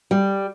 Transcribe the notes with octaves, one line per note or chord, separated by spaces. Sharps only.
G3